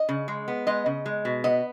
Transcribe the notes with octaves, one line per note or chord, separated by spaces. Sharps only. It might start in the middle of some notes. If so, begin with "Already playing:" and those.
Already playing: D#5
C#3
G#3
B3
G#3 D#5
C#3
G#3
B2
B3 D#5